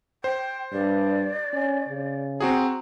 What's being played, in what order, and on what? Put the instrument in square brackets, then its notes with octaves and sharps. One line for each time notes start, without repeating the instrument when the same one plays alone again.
[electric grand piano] C5 [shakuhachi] G5
[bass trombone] G2 [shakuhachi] D5
[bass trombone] C#4
C#3
[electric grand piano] C4 F#4 G#4 [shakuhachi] A#5